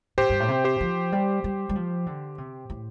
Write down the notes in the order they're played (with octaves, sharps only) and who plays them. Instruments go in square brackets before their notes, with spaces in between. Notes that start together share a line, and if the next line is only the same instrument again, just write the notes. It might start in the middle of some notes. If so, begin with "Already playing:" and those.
[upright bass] A2 [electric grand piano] G4 C5
[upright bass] G2
A2
C3
[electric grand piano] G4 C5
[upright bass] F3
G3
G3
G3
F3
D3
C3
A2